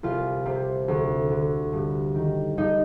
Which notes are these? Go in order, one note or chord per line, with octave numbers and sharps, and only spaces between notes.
C2 F4
C3
D2
D3
G2
D#3
G2 D#4